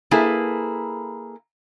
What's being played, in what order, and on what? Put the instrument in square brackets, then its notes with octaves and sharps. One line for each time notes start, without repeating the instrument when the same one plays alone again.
[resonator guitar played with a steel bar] A#3 E4 G#4 A4 B4